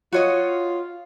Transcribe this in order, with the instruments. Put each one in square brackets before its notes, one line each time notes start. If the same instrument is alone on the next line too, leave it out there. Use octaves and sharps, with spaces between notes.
[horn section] F4 [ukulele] F#4 C#5 D#5